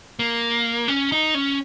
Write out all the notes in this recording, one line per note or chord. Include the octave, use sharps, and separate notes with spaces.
A#3
C#4
D#4
C#4